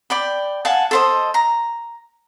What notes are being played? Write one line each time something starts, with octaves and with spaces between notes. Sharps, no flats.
D5 G5 B5
F5 F#5 G#5 A5
A4 C5 D#5
A#5